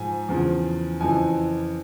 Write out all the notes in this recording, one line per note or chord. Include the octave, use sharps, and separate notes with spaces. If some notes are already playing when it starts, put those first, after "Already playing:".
Already playing: G#2 F3 G#5
E2 C#3 F3
F2 C#3 E3 G#5